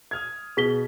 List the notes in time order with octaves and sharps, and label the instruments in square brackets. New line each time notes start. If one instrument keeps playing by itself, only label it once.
[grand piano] D#6 F6 G#6
[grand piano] B2 [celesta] G#4 B6 G7